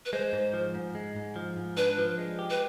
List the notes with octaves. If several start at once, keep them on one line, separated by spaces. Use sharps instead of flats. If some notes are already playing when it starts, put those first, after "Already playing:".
B4
G#3 C5
G#2
F3
G#2
G#3
G#2
F3
G#2
D4 B4
F3
G#3
G4
B4